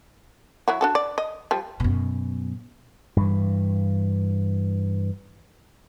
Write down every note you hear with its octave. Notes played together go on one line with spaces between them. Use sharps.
F#3 E4 F#4
D4 F#4 A4
D5
D#5
F3 G3
F#2 B2
G2 E3